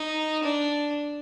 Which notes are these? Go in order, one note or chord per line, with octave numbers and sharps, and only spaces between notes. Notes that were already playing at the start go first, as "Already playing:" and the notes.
Already playing: D#4
D4